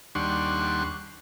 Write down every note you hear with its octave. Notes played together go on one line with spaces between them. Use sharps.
D#2 G3 D4 F#5 C6 C#6